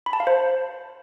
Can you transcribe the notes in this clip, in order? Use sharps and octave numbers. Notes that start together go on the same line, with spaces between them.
B5
A5
F5
C5